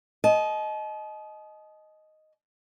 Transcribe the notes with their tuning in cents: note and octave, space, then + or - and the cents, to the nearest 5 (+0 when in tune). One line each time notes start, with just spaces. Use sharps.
D#5 +0 A5 -45